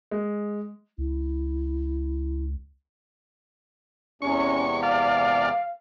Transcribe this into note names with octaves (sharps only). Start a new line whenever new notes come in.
G#3
C#2 E4
E2 C3 G#3 C#4 C#6
D5 F5 F6